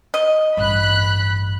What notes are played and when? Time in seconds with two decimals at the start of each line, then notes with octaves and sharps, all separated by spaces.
0.14 D#5
0.57 A1 G2 B5 F#6